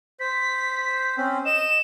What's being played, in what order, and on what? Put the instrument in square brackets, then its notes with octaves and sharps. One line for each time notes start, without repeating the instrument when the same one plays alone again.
[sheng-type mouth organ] C5 [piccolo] B6
[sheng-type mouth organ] C4 C#4 C5
[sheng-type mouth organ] D#5 [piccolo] E7